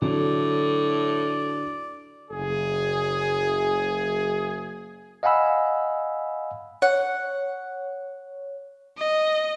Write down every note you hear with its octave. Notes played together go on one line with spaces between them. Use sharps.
A2 D3 F#3 D5
F#1 G#4
D#5 F5 F#5 G#5 B5 E6
C#5 F#5
D#5